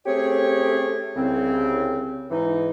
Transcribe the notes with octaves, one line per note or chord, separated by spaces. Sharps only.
A3 C4 C#4 G4 G#4 C#5
C2 C#3 C4
G#2 E3 D#4